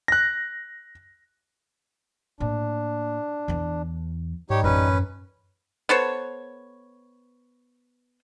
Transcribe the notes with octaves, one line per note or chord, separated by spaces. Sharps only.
F#6 A#6
A2 A#3 D4
E2 E3
G#2 G3 D#4 G4 C#5
A1 F#2 D#3 C#4 B4
B3 A4 C5 C#5